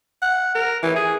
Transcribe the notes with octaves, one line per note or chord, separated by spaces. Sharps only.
F#5
A#4
E3
G#4